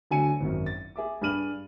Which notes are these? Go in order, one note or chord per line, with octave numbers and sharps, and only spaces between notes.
D2 D3 F#3 G#5 C#7 D#7
G#1 F#2
A6
G#4 E5 D6
G2 D4 G#4 F6 D#7 F#7